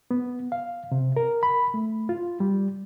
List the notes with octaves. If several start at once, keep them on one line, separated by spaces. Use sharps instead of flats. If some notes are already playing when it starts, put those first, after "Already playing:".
B3
F5
C3
A#4
B5
A3
F4
G3